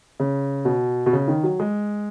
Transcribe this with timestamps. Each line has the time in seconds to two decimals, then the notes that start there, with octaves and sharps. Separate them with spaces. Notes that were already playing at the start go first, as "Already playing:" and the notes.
0.20 C#3
0.65 B2
1.06 B2
1.13 C#3
1.28 D#3
1.44 F#3
1.60 G#3